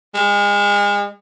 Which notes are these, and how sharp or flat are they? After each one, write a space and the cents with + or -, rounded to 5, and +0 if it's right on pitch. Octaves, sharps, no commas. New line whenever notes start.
G#3 -35